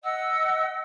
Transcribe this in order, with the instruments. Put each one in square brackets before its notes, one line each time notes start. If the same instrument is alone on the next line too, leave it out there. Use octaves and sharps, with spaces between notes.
[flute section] D#5 F#5 [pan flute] E6